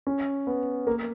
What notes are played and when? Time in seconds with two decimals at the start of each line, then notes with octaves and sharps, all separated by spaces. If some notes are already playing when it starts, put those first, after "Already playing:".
0.07 C#4
0.47 B3
0.87 A#3